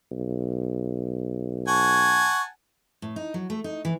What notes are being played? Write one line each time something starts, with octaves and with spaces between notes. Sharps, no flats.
B1
F#5 G#5 A5 C#6
A2
D#4
F#3
A3
D#4
E3